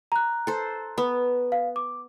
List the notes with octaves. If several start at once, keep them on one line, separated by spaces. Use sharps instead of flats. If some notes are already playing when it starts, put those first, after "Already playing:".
A#5 F#6
A4 C5
B3
F5
D6